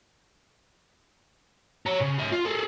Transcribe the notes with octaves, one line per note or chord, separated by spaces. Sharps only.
C#5 A#5
C#3
C#4 E5
F4
G#4 A4